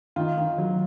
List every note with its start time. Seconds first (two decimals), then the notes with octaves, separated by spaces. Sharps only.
0.16 D#3 F4
0.37 D#3
0.58 F#3